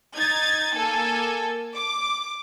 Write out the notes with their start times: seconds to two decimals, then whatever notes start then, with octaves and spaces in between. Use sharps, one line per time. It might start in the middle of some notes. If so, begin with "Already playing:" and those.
0.14 D#4 G#6 A6
0.76 A#3 A4 G#5
1.75 D6